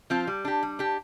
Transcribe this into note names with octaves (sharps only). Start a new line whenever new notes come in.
F3 C4 F4
G3
D4 G4
G3
D4 G4